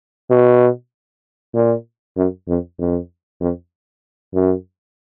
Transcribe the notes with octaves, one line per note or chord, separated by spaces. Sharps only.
B2
A#2
F#2
F2
F2
F2
F#2